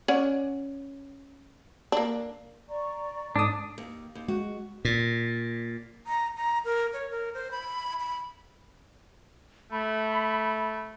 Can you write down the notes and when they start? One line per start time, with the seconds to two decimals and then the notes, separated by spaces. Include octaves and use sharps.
0.08 C#4 D5 F#5
1.92 A#3 D4
2.69 D5 A#5 C#6
3.36 G#2 D4 A4 D#6
3.78 D#2
4.15 D#2
4.28 G#3 F#4
4.85 A#2
6.06 A#5
6.37 A#5
6.65 A#4
6.93 C#5
7.11 A#4
7.34 C5
7.51 B5
8.00 B5
9.72 A3 B5